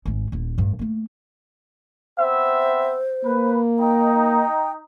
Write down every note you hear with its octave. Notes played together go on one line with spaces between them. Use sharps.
G#1 G#3
D#1 E4
A1 G2
A3 A#3
B3 C4 C5 E5
A#3 B4
D#4 G5